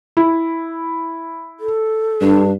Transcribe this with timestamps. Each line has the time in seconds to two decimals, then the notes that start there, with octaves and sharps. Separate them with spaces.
0.17 E4
1.60 A4
2.21 G2 D4